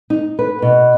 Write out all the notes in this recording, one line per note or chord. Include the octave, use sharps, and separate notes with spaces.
D#4
B4
B2